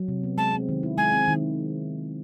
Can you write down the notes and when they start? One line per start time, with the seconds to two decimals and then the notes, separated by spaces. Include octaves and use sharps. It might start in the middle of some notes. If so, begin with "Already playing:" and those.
Already playing: F#3
0.08 C3
0.24 B3
0.38 G#3 A5
0.54 C4
0.69 D#3
0.83 E4
0.98 G#3 G#5
1.12 C4
1.28 D#3